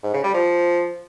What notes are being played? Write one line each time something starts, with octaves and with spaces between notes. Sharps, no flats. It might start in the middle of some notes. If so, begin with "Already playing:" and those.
G#2
C#3
G3
F3